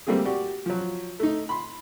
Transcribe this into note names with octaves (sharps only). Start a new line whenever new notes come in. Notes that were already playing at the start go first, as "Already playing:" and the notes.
G3 A3 A#3 C4 F4 G#4
F#4 G4 D5
F3 F#3
A3 D#4
B5 C6